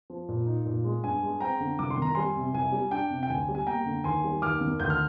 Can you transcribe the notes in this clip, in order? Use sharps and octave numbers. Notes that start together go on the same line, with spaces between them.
F3
A#2
D#4
A#2
G#3
G2 G#5
G#3
C4 G5 A#5
D3
C2 D6
C6
D#3 A#5
G3 G#5 C6
C3
C2 G#5
G3
D4 G5
C3
G5
D2 G#5
G3
G#5
A#3 G5 A#5
D3
D#2 G#5 C6
G3
D#2 D6 F6
D#3
D2 G6
F6